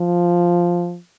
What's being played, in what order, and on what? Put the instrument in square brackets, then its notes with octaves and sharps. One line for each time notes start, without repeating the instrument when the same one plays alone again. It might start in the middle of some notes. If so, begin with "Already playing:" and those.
Already playing: [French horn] F3